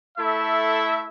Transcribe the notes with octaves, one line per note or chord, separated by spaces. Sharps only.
A3 E4 A4 E5